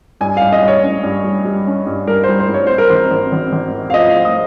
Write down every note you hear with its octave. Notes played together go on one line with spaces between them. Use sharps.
G2 G#5
G2 F5
D#5
G2
C#5
C#4
G2
G3
G3
C#4
G2
G2 A#4
G3 C5
C5
G2 C#5
C4 C5
A#4
G#1 C5
G#1
G#1
G#1
C4
F5
F3 D#5
F5
C4
D#6